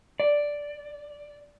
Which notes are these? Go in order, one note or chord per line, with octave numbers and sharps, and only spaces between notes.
D5